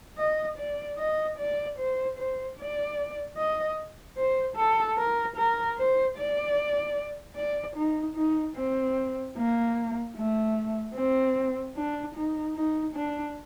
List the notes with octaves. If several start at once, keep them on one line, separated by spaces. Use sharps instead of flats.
D#5
D5
D#5
D5
C5
C5
D5
D#5
C5
A4
A#4
A#4
C5
D5
D5
D#4
D#4
C4
A#3
A3
C4
D4
D#4
D#4
D4